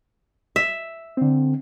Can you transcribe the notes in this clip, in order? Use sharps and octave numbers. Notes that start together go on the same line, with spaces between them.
E5
D3 C4